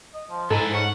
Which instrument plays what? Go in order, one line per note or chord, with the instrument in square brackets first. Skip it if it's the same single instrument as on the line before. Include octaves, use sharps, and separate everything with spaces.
[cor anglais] D#5
F3
[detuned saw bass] G#2 [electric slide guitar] G#3 E4 G#5 [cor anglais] D#4 [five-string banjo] A4
[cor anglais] C#4 [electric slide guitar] F#5